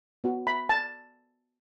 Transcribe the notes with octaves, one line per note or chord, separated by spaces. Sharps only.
B3 F#4
B5
A5